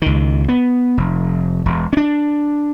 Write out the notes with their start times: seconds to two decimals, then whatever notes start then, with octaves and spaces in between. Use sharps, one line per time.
0.02 C#2 D#3
0.48 B3
0.97 F1
1.66 E1
1.93 C#4 D4